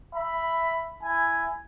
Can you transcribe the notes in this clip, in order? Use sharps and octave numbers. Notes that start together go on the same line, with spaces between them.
E5 B5
E4 G#5